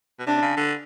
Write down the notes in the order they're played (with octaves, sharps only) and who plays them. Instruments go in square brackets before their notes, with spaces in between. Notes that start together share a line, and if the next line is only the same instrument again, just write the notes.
[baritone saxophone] B2
[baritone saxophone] C3 [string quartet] D4
[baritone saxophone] C#3
D3